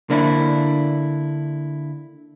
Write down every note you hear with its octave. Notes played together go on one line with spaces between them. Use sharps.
D3 A#3 D4 E4